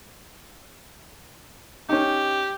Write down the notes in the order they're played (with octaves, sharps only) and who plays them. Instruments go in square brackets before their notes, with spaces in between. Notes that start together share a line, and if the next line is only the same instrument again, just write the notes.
[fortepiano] C#4 D#4 [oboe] G4